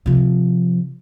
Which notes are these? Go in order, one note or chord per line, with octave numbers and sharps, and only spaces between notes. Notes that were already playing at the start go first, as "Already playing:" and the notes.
C3 F3